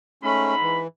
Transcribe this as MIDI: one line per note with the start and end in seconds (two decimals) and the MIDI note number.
0.23 0.82 44
0.23 0.55 57
0.23 0.55 61
0.23 0.82 83
0.62 0.87 52